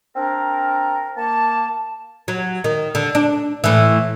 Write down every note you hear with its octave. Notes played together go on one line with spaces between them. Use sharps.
C4 D4 A#4
A#3 A5
F#3
D#3
D3
D4
A2 E3